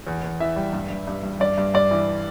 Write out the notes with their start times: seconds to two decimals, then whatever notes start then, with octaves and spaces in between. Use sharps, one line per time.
0.07 E2
0.23 E2
0.40 E3 E5
0.56 G3
0.73 G2
0.90 G2
1.07 G2
1.23 G2
1.40 G2 D5
1.58 G2
1.74 G2 D5
1.91 E3